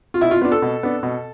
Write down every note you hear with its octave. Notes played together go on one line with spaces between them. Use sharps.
F4
B2 E4
F4
B3 D4 F4
A4
B2
B3 D4
B2